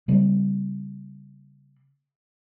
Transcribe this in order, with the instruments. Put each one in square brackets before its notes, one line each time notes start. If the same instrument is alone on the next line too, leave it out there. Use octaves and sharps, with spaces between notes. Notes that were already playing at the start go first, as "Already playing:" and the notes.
[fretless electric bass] C#3 G3 A#3 C4